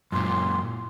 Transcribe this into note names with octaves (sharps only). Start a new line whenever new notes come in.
F#2 A#2 C6